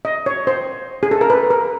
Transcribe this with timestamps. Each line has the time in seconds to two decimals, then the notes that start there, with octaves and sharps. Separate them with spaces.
0.05 D#5
0.26 C#5
0.47 C5
1.03 G#4
1.11 A4
1.21 A#4
1.30 B4
1.51 A#4